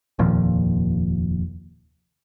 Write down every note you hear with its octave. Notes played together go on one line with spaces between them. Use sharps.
F1 D#2 A#2 F3